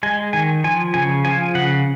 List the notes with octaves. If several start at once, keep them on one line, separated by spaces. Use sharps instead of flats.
G#3 G#5
D#3 G#5
F3 G#5
C#3 G#5
F3 G#5
C#3 F#5